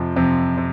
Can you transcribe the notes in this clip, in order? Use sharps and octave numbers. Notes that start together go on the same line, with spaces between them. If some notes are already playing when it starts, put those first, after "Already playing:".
Already playing: F2 C3 F3
F2 C3 F3
C3